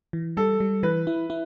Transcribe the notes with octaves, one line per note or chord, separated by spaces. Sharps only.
E3
G3 A4
G3
E3 B4
E4
E4